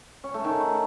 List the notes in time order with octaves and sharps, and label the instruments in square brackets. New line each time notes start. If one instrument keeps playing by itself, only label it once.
[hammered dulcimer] C#4
A3
D#3